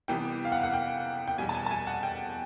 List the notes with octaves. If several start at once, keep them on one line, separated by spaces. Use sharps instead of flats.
C2 C3 E3 G3 B3 G5
F5
F#5
F#5
G5
G5
E2 B2 G3 G#5
A5
G#5
A5
G#5
F#5
G5